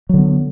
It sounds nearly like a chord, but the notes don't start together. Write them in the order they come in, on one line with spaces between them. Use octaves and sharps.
F#3 D3 B3